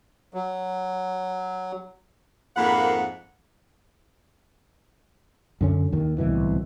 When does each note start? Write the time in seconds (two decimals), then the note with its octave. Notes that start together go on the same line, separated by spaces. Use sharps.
0.34 F#3
2.57 F2 G#2 A#3 F#5 B5
5.61 F#2 D3 C#4
5.93 D#2 D#3
6.18 D1 C2 B2 E3